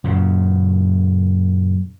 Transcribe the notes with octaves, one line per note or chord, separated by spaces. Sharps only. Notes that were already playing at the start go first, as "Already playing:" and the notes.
F#2 A#2 C#3